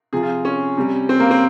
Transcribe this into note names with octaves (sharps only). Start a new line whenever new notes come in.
C3 F3 G#4
F4
C#4
C3 G3
C4
A#3
C4